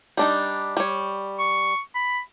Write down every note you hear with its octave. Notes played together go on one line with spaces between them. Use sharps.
G3 D4 D#4
G3 C#5
C#6
B5